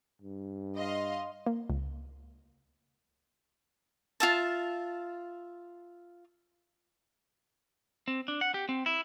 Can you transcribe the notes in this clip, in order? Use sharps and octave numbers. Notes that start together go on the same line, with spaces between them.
G2
D#5 F5 C6
A#3
C#2
F4 E5 A5
C4
D4
F#5
G4
C4
E4